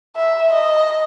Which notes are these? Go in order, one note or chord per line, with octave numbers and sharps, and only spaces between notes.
E5
D#5